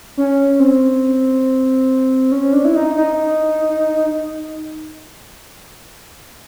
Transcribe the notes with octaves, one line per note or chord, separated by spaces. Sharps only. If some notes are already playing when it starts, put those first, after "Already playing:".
C#4
C4
C#4
D4
E4
D#4
D#4